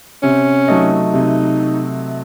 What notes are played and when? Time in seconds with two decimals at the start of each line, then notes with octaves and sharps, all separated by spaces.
0.23 C3 C#4
0.68 F#3 A3 D#4
1.13 C3 D#4